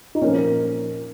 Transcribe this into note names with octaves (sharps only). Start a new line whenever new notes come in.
D#4
A#2 F3 A#3 C#4